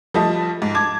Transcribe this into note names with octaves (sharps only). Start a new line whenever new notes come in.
F3 G3 A3 D#5 A5
G#2
A5 D6 G#6